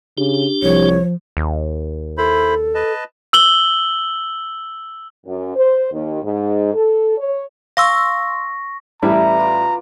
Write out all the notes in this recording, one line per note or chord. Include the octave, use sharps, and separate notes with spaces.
C#3 D4 G4
C2 F3 C#5
D#2
E4 A4 C5 B5
B4 D#5 A5
E6 F#7 G7
F#2
C5
D#2
G#2
A4
C#5
F5 C6 C#6 E6 A#6
A1 E3 G3 E4 D5 A#5 B5
F4 D5